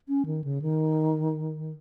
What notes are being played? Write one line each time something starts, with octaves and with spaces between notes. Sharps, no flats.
C#4
D#3
C#3
D#3